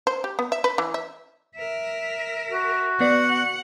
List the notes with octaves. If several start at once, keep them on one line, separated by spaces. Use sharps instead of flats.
C5
G4
B3
E5
B4
E3
E5
A#4 E5
F#4
B3 D5 F#5